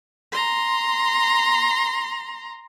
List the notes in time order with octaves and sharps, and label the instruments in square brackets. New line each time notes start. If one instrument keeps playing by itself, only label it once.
[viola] A#5 C6